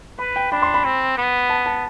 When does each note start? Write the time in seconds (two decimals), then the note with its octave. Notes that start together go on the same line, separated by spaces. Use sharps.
0.19 B4 B5
0.36 G5
0.51 D4 B5
0.62 C6
0.74 B5
0.85 C4
1.17 B3
1.49 A5
1.66 A5